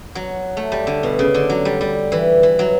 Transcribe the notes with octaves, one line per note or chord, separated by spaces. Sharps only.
F#3
A3
G3
D3
B2
C#3
D3
F#3
G3
G3
E3
E3
F#3